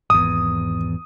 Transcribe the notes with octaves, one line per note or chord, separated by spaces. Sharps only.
G#1 E2 D#6